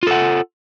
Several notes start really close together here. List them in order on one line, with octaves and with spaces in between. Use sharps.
F4 A4 F#5